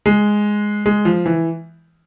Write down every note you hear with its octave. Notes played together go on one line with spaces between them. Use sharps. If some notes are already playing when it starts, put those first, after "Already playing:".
G#3
G#3
F3
E3